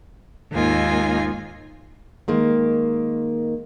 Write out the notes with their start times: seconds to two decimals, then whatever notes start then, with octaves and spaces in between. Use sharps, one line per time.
0.52 D#2 G#2 A#3 D#4 F4 G#5
2.28 D#3 G#3 A#3